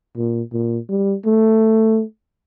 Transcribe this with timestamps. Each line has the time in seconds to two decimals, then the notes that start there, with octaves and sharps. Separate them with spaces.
0.17 A#2
0.53 A#2
0.90 G3
1.26 A3